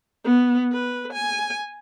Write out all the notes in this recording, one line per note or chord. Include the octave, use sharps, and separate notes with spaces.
B3
B4
G#5